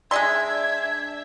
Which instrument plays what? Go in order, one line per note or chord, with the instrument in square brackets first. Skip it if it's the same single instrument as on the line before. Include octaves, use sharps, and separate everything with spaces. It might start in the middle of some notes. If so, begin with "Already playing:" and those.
[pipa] G#3 G#4 C6 [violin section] D4 E5 [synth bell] D5 E6 [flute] G#6